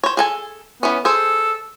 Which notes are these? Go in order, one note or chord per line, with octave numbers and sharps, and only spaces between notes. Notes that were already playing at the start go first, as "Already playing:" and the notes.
C5 C#5
G#4 A4 G#5
E3 B3 C#4
G#4 A4 C5